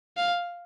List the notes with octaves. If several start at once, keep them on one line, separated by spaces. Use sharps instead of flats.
F5